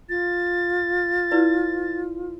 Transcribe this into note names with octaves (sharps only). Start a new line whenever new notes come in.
F4 A6
E4 B4 D5